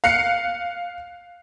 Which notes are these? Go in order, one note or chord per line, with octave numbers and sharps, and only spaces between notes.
F5 F#6 C7 C#7